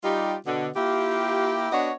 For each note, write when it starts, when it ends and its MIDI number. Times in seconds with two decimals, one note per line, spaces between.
0.04 0.35 55
0.04 0.35 63
0.04 0.35 65
0.04 0.35 67
0.47 0.69 47
0.47 0.69 50
0.76 1.68 58
0.76 1.68 64
0.76 1.68 65
0.76 1.68 67
1.72 1.92 59
1.72 1.92 62
1.72 1.92 66
1.72 1.92 73
1.72 1.92 75